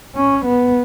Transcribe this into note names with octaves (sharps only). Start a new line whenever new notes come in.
C#4
B3